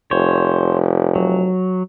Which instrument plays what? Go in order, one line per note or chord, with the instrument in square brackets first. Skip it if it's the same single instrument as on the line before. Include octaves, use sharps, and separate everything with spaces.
[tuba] F1 [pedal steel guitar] C5 C#5
[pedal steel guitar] F#3